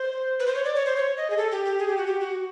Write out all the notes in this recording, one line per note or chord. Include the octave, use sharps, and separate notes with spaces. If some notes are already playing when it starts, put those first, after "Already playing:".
Already playing: C5
B4
C5
C#5
D5
C#5
C5
C#5
D#5
G#4
A4
G4
G4
G#4
G4
F#4
G4
F#4